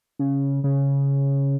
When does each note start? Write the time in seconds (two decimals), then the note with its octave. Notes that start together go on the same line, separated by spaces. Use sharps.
0.19 C#3
0.64 C#3